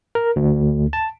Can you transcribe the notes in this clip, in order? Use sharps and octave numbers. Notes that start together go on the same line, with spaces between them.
A#4
D2
A5